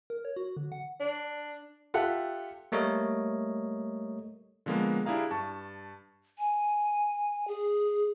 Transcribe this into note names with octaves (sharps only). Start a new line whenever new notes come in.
A#4
C#5
F#4
D3
F#5
D4
F4 G4 A4 E5 F#5
G3 A3 A#3 A#4 C#5 D#5
D3 F3 G#3 A#3 B3
D4 E4 G4 G#4 F5 A#5
G2 A5 C#6
G#5
G#4